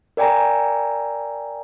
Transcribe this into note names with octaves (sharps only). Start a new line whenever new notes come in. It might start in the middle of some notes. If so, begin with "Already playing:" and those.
A#4 D5 G5 G#5 A#5